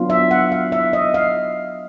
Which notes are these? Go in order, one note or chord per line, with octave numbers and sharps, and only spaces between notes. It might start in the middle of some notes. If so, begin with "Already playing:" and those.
Already playing: F#3 B3 D4 F4
E5
F#5
F5
E5
D#5
F5